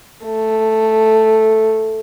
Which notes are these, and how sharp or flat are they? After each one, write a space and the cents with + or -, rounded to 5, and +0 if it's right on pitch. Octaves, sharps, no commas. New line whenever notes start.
A3 +0